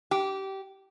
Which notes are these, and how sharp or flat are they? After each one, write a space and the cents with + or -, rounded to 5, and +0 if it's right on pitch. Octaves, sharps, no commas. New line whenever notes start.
G4 -20